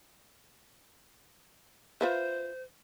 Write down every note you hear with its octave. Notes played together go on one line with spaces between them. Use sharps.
F4 B4 C5 E5